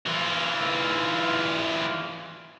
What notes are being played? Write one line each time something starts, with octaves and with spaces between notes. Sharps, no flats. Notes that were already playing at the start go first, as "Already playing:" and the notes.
E3 F4